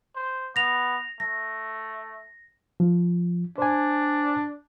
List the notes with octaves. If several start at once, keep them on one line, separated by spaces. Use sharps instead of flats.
C5
B3 A#6 F7
A3 A#6
F3
D4 C5 G#5